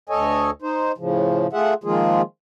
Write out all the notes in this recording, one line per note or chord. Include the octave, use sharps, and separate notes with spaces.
D2 A4 C#5 D#5 G#5
D#4 C5
A2 C#3 F3
A3 F4 G#4 E5 F#5
D#3 F3 G#3 A#3 F4 G#4